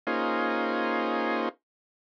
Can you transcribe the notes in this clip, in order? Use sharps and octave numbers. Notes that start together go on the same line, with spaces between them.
A#3 C#4 D#4 F4 G#4 C5